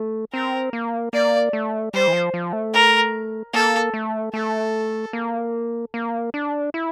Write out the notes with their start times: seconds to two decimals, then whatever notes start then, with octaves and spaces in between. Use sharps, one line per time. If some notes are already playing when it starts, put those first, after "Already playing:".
Already playing: A3
0.33 C4 A#4
0.73 A#3
1.13 A#3 D5
1.53 A3
1.93 G3 C5
2.08 E3
2.13 F3
2.34 F3
2.53 A3
2.74 A#4
3.53 A#3 A4
3.94 A3
4.34 A3 A4
5.13 A#3
5.94 A#3
6.34 D4
6.74 E4